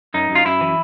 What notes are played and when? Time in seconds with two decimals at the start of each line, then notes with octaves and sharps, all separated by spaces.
0.14 F#2 D#4
0.30 F#2
0.35 F4
0.45 F#2 E4
0.61 E3